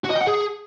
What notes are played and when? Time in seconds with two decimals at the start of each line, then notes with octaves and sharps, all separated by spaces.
0.05 F#4
0.10 D#5
0.16 G5
0.22 F#5
0.27 G#4